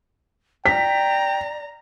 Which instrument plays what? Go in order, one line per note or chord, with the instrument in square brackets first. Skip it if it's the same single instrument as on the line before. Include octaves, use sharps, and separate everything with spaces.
[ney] D5 [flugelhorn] G5 [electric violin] A#5 [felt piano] B6